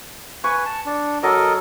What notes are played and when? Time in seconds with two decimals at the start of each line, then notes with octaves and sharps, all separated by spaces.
0.44 B4 G#5 C#6
0.66 A5
0.86 D4
1.23 F#3 A4 A#4 D#5